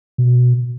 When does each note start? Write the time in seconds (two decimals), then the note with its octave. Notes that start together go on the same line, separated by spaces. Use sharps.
0.18 B2